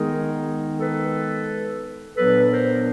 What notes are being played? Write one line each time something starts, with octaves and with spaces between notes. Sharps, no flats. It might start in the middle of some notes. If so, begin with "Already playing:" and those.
Already playing: D#3 G#3 B3 D#4 G#4 A#4
A4 B4
A#2 F#3 B3 D4 A4 B4
A#4 C5